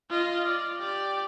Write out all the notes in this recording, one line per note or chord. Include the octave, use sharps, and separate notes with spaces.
F4 D#5
D5
G4 D5